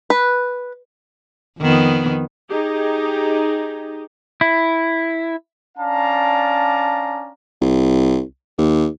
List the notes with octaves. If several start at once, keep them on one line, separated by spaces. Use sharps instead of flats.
B4
F2 D#3 B3
D#4 G4 G#4
E4
C#4 D4 D5 F5 A5 A#5
C2
D#2